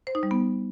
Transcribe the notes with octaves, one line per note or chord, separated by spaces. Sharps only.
C5
D#4
G3
B3